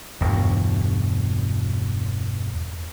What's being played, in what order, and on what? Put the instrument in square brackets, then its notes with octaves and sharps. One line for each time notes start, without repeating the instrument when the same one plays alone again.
[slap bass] E1 E2 G2 B2